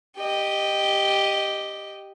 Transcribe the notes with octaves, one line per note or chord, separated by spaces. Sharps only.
G4 D#5